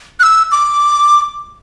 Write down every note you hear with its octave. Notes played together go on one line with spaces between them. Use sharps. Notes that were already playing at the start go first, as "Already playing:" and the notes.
F#6
E6
D6